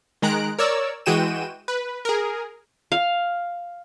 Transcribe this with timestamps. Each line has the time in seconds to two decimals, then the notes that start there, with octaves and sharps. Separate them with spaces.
0.22 D#3 G#3 A#5 F#6 D7
0.59 A#4 C#5 D5 E6
1.06 E3 G#3 F#4 G5 D#7 E7
1.68 B4
2.05 G#4 A#4
2.92 F5